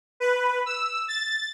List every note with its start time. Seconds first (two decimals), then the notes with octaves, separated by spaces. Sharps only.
0.20 B4
0.66 E6
1.08 A6